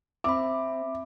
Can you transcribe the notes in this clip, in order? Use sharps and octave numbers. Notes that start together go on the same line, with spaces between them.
C4 E5 B5 D6